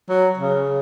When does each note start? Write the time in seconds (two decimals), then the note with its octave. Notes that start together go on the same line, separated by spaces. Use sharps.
0.09 F#3
0.37 C#3